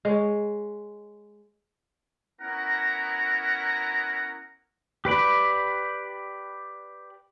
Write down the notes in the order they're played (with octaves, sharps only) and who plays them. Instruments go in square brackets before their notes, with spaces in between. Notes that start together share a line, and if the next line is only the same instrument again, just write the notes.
[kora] G#3 C#5
[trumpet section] B3 C#4 E4 A#4 F#5 A#5
[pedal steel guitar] G4 B4 D5 B5